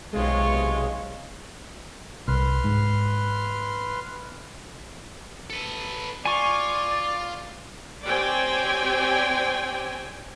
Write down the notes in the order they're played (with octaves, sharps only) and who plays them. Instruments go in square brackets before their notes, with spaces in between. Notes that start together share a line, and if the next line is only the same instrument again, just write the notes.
[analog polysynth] B1 C3 G#3 [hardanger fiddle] F4 C#5
[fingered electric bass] C2 [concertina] B4 C6 F6
[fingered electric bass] G#2
[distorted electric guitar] A4 B4
[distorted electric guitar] F4 [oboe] D5 [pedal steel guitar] G#5 C#6
[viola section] C4 G4 C#5 D5 G5 G#5